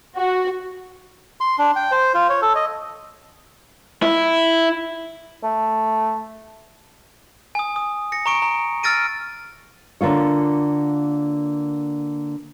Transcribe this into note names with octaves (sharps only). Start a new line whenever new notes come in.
F#4
C6
D4
G5
C5
F4
C#5
A4
D#5
E4
A3
G#5 D#6
D#6
A#6 C#7
A#5 C#6 D7
A#5
E6 F6 A6 A#6 D7 D#7
D3 A#3 F4 C#5